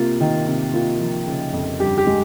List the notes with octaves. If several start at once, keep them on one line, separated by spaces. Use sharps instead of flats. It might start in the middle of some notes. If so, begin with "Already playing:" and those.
Already playing: C3 A#3 F4
D#3
C3
A#3 F4
F3
C#3
F2
G2 G4
G4
G#3